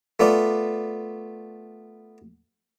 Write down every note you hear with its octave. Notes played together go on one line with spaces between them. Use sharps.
A3 B3 F4 D5